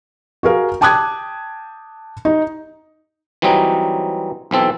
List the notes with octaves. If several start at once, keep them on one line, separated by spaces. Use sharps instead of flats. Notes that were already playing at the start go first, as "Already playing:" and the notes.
F#4 G#4 A#4 F5
G5 A5 D6 D#6 F#6 G#6
D#4
E3 F#3 G3 C4 D#4
B1 E3 C4 A4